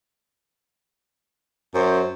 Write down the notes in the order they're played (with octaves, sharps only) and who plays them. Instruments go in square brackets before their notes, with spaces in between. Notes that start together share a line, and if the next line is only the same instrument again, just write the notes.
[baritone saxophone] F#2 [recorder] C5